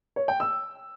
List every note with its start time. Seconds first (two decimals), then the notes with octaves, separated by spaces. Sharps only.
0.16 C#5
0.28 G5
0.40 E6